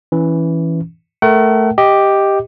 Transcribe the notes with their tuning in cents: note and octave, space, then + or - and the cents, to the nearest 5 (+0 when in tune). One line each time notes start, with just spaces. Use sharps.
E3 +0 C#4 +0
A3 +0 A#4 +0 F#5 +45
G4 +0 D#5 +10